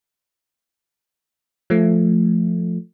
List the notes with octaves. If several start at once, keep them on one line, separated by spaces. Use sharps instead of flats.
F3 A3